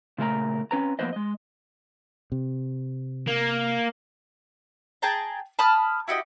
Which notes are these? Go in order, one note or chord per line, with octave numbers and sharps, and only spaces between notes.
A#2 C#3 A3 A#4 C5 A#5
C4 C#4 B4 A#5
F3 A#3 B3 B4 C5 D#5
G#3 D#5
C3
A#3
G#4 G5 A5 A#5
A5 B5 D#6 F6
E4 F#4 G4 D#5